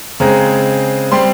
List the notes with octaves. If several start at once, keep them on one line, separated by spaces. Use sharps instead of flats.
C#3 G#3 C4 A#5
G3 C4 C6